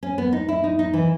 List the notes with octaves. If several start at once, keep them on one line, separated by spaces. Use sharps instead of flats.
C#4
B3
D#4
E4
D#4
D#4
E3